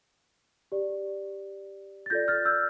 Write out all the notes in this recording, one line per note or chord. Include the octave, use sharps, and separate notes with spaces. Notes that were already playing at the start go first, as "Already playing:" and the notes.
G4 D5
A6
F4 A4 D5 G6 A#6
F6 A6
E6 G6